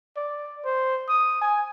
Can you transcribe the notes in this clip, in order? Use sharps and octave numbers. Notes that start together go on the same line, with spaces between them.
D5
C5
D#6
G#5